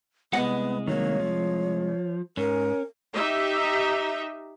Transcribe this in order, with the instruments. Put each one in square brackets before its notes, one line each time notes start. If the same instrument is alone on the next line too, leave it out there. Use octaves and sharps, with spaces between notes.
[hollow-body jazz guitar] C2 D#5 F#5 [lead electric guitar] G#3 [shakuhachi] B3
[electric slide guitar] D#3 F#3 A#3 [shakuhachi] C#5
[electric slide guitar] F3
[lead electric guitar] G#2 [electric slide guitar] C#4 [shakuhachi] A#4
[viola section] D#4 G4 E5